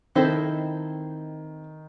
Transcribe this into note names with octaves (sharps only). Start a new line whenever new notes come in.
D#3 C4 E4 A4 C5 D#5